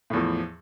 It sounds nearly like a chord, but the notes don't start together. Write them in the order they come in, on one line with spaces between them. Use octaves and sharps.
A2 E2 F3